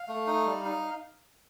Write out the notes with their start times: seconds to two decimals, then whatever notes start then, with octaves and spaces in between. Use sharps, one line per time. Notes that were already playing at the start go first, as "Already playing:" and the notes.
Already playing: F5
0.08 A3
0.27 D#4
0.46 G3
0.65 D#4